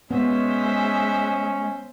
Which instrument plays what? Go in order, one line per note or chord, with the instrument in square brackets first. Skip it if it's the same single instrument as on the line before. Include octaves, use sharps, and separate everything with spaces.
[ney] G#3 [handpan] B3 [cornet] C#4 [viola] C5 E5